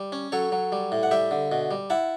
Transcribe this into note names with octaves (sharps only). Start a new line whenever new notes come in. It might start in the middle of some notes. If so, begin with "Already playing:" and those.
Already playing: G3
C#4
F#3 A4 C#5
F#3
G3
A2
F#5
G3 E5 G5
D3
B2
G3
E4 F#5 A5